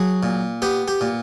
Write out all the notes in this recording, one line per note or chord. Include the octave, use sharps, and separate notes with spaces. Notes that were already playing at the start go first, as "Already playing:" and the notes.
Already playing: F#3 G#4
A#2
B3 G4
G4
A#2